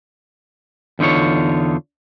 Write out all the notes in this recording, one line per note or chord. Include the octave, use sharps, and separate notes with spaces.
E2 D3 D#4 F4 C#5